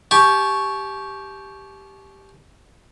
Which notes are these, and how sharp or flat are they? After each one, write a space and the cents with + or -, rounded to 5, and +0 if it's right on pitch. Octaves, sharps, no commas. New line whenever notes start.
G4 +0 A5 -40 C#6 +0